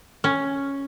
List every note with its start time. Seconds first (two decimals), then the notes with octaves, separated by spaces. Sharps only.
0.24 C#4